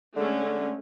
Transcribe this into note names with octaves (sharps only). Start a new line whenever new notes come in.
D3 G#3 A3 C#4